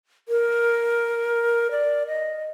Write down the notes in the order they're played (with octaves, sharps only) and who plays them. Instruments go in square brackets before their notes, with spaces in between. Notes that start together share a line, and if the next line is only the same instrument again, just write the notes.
[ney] A#4
D5
D#5